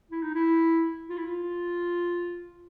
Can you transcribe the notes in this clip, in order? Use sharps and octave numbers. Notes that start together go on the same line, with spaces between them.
E4
D#4
E4
F4
E4
F4